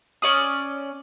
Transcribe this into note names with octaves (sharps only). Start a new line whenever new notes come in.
C#4 D5 D#6